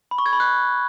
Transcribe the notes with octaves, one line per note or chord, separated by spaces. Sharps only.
B5
C#6
G#6
B5
F#6